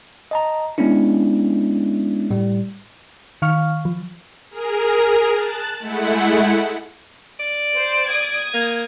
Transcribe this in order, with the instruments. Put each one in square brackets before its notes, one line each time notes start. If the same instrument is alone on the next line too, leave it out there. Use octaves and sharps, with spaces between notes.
[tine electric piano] D#5 A5 A#5
G#3 B3 C#4 D4 E4
A2 G3
[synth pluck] D#3 F5 C#6 F6
F3
[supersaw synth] G#4 A#4
A5 F#6
G#3 A3 E4 F#5
[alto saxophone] D5
[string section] C5
D#6 G#6
[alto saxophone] A#3